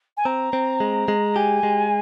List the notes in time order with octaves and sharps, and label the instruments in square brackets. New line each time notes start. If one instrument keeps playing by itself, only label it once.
[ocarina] G#5
[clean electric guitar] C4 [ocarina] A#5
[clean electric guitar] C4
G#3
G#3
[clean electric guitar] G4 [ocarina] G#5
[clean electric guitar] G#3